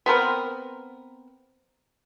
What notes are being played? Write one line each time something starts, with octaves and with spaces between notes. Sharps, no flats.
B3 C4 A#4 B4